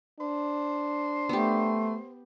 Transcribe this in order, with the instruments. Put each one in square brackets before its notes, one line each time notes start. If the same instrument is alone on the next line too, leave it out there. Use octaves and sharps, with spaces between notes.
[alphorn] D4 [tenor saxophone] C5
[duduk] A3 [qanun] B3 G4